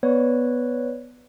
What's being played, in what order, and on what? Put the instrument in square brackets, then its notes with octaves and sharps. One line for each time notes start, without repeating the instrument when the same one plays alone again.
[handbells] B3 B4 C#5 D5